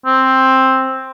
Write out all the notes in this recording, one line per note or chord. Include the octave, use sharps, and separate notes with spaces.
C4